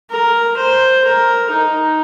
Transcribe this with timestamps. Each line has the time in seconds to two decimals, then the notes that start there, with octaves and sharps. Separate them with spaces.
0.10 A#4
0.57 C5
1.04 A#4
1.51 D#4